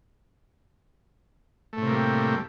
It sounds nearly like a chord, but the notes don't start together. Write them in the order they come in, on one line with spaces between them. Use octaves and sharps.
A3 A2 C3 A#3 G3